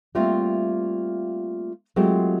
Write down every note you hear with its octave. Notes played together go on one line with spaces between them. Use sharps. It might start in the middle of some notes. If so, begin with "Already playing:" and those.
G3 A3 A#3 C4 F4 E5
F#3 G#3 A3 C4 F4 G4